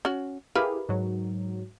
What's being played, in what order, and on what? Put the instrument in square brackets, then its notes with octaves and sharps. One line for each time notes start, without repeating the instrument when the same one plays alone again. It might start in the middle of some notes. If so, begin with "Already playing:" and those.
[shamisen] C#4 F#4
[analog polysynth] E4 G4 G#4 [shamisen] A#4 B4 F5
[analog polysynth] G#2 F#3